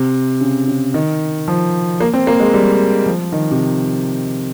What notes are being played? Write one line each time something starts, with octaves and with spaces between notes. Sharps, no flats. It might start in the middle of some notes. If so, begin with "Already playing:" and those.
Already playing: C3
C#3
C#3
D#3
F3
A#3
C4
A#3
G#3
G3
F3
D#3
C3